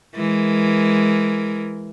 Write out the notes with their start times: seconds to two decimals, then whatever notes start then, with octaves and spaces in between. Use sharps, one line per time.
0.15 E3 G#3 A#4